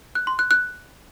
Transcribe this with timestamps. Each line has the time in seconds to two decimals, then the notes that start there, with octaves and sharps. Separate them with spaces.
0.15 F#6
0.27 C6
0.39 F#6
0.51 F#6